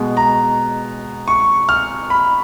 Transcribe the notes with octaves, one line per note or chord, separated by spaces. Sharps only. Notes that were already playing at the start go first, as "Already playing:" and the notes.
Already playing: B2 G#3
A#5
C#6
F6
B5